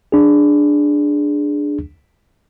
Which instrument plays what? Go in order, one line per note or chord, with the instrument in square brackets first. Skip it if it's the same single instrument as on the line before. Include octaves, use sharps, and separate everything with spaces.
[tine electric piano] D4 G#4